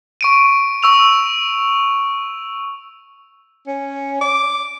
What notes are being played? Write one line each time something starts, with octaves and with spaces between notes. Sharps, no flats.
C#6 D7 D#7
C#6 E6 F7
C#4
D6